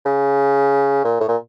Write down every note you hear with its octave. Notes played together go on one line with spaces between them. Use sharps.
C#3
A#2
A2
A#2